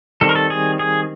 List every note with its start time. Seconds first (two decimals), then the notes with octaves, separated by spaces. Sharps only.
0.21 D#3 G3 C4 A4
0.29 A#4
0.35 A4
0.50 G#4
0.79 G#4